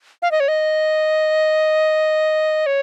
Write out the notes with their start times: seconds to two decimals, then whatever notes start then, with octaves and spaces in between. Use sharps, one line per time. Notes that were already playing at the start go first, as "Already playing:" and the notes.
0.22 F5
0.31 D#5
0.40 C#5
0.48 D#5
2.66 C#5